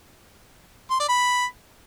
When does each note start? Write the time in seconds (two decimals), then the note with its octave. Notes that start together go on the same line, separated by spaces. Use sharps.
0.90 C6
0.99 D5
1.08 B5